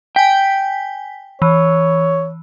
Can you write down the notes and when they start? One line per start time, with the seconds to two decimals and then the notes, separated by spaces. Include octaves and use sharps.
0.16 G5 G#5 B6
1.42 E3 C#5